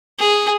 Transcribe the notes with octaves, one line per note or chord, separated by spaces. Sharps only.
G#4